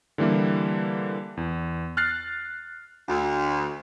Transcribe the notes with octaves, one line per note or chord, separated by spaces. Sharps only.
D3 E3 G3 A#3 E4
E2
F6 F#6 A6 C7
D2